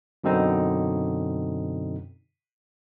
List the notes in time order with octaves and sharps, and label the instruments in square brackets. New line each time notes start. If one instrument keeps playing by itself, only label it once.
[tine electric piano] F#2 B2 D3 C4 D#4